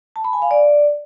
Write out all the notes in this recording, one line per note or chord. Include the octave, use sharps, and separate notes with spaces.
A5
B5
G#5
F5
D5